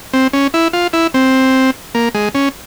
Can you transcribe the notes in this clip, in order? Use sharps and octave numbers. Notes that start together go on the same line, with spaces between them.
C4
C#4
E4
F4
E4
C4
A#3
G#3
C#4